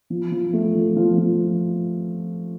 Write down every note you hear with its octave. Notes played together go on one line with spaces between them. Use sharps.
F3
F3
A3
F3
F3
F3